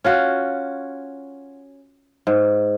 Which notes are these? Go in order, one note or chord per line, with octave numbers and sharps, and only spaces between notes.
C#4 F4 F#4
G#2